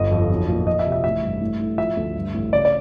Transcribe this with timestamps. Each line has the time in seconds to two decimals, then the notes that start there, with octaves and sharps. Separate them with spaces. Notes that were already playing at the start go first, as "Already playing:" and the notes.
Already playing: G1 D#5
0.11 F2
0.30 B1
0.48 A#2
0.67 F3 D#5
0.79 E5
0.86 C3
0.92 E5
1.04 A1 E5
1.23 G2
1.41 A2
1.60 A2
1.78 F3 E5
1.97 D2
2.16 G2
2.34 A1
2.53 C#3 D5
2.65 D5